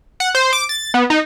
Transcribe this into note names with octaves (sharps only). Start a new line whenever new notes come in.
F#5
C5
D6
A6
B3
D#4